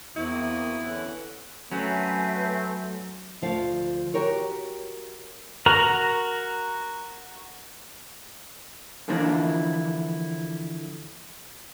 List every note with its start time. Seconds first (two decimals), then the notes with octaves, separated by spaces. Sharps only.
0.16 E2 A#3 C4 E4 F#4 D#6
0.84 D3 E3 C#4 F#5
1.72 F#3 A3 C4 C#4 B4 E5 G#5
3.42 D2 F3 F5
4.14 F#4 G4 A#4 C#5
5.66 F#4 A#4 A#5
9.08 D3 E3 F3 A#3 D4 E4